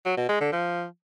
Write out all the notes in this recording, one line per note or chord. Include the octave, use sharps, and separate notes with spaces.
F#3
B2
G#3
D3
F3